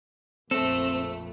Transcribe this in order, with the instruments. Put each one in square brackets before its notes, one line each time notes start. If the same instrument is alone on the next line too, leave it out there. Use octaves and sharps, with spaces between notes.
[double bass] A#1 F2 [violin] A3 [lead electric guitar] C4 [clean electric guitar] A4